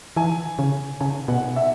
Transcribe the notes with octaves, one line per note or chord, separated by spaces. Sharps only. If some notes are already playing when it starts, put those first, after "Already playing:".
E3 G#5
C#3
C#3 G#5
B2 F#5
E5